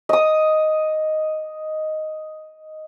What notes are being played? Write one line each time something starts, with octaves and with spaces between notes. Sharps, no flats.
D#5 D#6